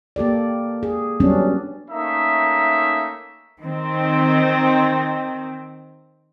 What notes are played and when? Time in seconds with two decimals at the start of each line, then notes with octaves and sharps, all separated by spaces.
0.16 A#3 G4 A4 D5
0.83 G#4
1.20 F#3 G3 B3 C#4 D4
1.90 A3 A#3 C#4 D#4 E5
3.62 D#3 C4